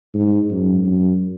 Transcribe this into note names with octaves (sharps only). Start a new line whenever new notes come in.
G#2
F#2
F#2